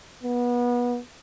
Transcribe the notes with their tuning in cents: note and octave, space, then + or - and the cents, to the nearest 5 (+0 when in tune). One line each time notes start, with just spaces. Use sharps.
B3 -25